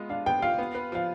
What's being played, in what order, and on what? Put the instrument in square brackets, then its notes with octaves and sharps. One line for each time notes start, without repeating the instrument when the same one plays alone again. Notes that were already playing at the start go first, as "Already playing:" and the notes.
Already playing: [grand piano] G#3 B3 F4
[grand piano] D4 [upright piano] F5
[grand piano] B3 [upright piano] G5
[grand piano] F4 [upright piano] F5
[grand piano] B3
B4
[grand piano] F3 [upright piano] F5